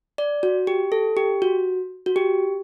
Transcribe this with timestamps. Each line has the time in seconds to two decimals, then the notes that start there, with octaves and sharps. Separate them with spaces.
0.18 D5
0.43 F#4
0.67 G4
0.92 A4
1.17 G4
1.42 F#4
2.06 F#4
2.16 G4